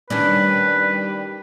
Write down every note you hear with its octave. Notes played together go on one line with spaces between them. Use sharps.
D#3 G3 C#4 D4 B4